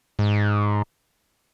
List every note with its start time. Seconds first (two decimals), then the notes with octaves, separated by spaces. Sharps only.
0.19 G#2